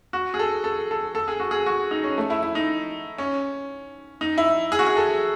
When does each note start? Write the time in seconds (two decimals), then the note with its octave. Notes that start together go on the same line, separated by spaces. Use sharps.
0.13 F#4
0.34 G#4
0.39 A4
0.64 A4
0.91 A4
1.15 A4
1.28 G#4
1.40 F#4
1.51 G#4
1.66 F#4
1.91 D#4
2.04 C#4
2.18 A3
2.30 E4
2.43 E4
2.55 D#4
3.18 C#4
4.21 D#4
4.38 E4
4.72 G#4
4.79 F#4
4.86 G#4
4.97 A4